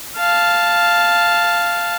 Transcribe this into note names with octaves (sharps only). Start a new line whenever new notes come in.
F5 A5